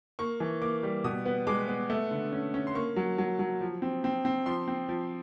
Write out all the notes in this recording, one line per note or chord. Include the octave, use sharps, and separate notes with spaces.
A#3 C#6
E3
A#3 D6
G3
B2 D#6
B3
G#3 D6
B3
A3
D3
C#4
C#4
C6
A#3 C#6
F#3
F#3
F#3
F3
C4
C4
C4
F3 C6
C4
F3